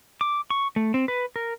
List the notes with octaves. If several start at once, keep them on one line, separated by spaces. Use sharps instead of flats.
D6
C#6
A3
C4
B4
A#4